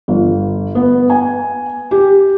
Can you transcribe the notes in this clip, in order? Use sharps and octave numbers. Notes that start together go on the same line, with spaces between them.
G1
B3
G#5
G4